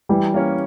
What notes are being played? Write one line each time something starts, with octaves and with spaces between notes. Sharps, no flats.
E3 G3
A#3 C#4